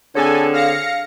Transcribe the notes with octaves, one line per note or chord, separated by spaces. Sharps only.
D3 C4 G#4 A4 C#5 G#5
F5 A#6 C#7